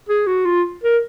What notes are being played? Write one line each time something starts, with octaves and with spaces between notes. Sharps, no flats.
G#4
F#4
F4
A#4